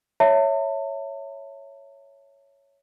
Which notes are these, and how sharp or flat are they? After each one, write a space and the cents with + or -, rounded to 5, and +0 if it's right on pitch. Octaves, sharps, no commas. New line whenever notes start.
C#5 +0 E5 +0 A5 +40